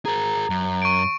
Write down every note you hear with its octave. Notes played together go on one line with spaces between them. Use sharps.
G#4 A#4 A#5
F#2
C#6 D7